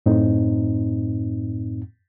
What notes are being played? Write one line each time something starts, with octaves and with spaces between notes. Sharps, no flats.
F#2 A2 C4 D#4